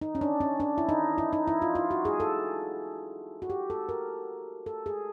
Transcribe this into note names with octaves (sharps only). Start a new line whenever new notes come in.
D#4
C#4
D4
C#4
D4
E4
D#4
E4
D#4
E4
F4
F4
F#4
G#4
A4
F#4
G4
A4
A#4
A4
G#4